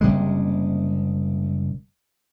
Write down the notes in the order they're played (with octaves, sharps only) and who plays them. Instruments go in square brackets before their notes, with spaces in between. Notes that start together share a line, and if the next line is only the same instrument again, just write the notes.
[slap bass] F#1 C3 G3 G#3